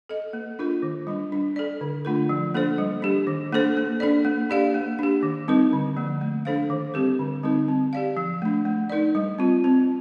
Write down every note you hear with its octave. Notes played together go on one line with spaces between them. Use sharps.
A4 D#5
A#3
D4 F4 A#4
D#3
G3 D4
D4
A4 D5
D3
A3 D4 F4 A#4
F3
A#3 D4 A4 C5
G3
D4 G4
D#3
A#3 D4 A4 C5
A#3
D4 A4 D5
A#3
D4 G4 D5 F5
A#3
D4 G4
D#3
G3 C4 D#4 A#4
D3
F3 A#3
A3
D4 A4 C5 F5
D#3
G3 C4 G4 A#4
D3
G3 C4 D#4 A#4
C4
G4 D5 F5
F3
A3 D4
A3
D#4 A#4 D5
G3
C4 F4
C4